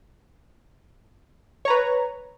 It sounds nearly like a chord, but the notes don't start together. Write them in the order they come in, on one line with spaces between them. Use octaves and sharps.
C#5 A#5 B4